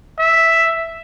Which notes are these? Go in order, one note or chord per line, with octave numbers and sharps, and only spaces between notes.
E5